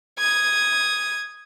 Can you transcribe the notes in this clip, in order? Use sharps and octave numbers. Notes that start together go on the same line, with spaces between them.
D#6 G#6